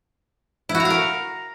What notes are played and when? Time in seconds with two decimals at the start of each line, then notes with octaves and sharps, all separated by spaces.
0.69 E4
0.75 F#4
0.80 A#5
0.85 F5
0.90 A#4